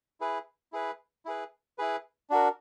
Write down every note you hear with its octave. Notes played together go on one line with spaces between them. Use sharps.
E4 G#4 B4
E4 G#4 B4
E4 G#4 B4
E4 G#4 B4
D4 F#4 A#4